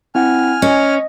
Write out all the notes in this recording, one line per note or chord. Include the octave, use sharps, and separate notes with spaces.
C4 E4 F#5 G#5 F6
C#4 D#5